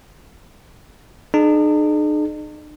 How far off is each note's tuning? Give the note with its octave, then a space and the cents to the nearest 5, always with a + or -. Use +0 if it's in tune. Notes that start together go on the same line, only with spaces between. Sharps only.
D#4 -45 G#4 +35